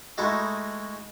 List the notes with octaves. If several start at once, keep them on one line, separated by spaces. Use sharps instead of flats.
G#3 A3 D#4 E4 F#4